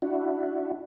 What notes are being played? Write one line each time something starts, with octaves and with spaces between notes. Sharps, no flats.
D4 E4 F#4